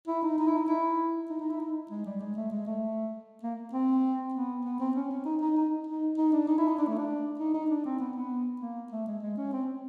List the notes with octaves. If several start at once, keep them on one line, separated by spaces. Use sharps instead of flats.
E4
D#4
D#4
E4
D#4
E4
D#4
D#4
E4
D#4
G#3
G3
G#3
A3
G#3
A3
A#3
C4
B3
B3
C4
C#4
C#4
D#4
D#4
D#4
D#4
D#4
D4
D#4
E4
D#4
D4
A3
D4
D#4
D#4
D4
C4
B3
B3
A#3
A3
G#3
G#3
C#4
C4